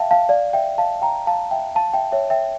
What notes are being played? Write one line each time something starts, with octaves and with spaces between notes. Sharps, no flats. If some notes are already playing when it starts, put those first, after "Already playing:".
Already playing: E5 F5 G5 A5
F5 A5
D5 F5
E5 G5
F5 A5
G5 A#5
F5 A5
E5 G5
F5 A5
E5 G5
C#5 E5
E5 G5